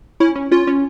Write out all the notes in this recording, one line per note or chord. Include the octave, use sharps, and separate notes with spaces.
C#4 E4
C#4
C#4 F4
C#4